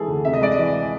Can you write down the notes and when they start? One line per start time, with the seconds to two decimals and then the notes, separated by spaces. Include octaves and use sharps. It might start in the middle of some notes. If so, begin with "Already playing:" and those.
Already playing: C3 E3 G#3 G#4 A4
0.08 D2
0.25 C3 E5
0.33 D#5
0.42 G#3 D5
0.52 D#5
0.58 E3